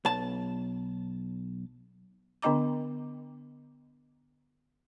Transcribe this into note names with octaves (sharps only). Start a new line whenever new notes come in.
B1 A5
D3 B3 D4 D#5 A#5 D6